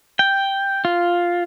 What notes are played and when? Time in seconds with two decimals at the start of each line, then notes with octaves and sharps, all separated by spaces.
0.19 G5
0.85 F4